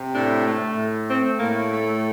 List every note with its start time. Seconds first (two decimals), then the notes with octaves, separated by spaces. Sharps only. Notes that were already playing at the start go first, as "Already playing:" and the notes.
Already playing: C3
0.14 A2 D4
0.46 A3
0.76 A2
1.08 A3 C4
1.39 A2 A#3
1.71 A3